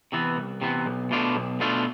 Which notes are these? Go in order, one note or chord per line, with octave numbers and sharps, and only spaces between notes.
C3 E3 B3
C2
C3 E3 B3
B1
B2 A3 D4 F4
B1
B2 A3 D4 F4